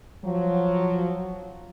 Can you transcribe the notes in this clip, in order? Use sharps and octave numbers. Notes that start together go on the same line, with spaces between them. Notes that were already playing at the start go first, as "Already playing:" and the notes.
F3 F#3